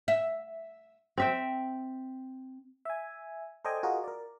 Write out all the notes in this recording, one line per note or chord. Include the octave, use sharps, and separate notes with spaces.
E5
C4 E5 G5
E5 G#5
A4 C5 D5 D#5 G5 G#5
F4 F#4 G#4 A#4 D#5
A#4 D5